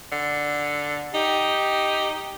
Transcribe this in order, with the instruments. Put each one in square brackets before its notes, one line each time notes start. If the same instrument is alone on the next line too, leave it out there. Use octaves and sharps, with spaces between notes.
[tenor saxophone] D3
[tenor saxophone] D#4 [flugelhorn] G4